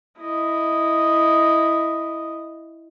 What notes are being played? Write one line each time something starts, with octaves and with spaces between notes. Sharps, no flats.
E4 D#5